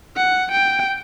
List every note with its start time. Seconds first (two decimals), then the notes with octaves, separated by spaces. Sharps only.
0.16 F#5
0.52 G5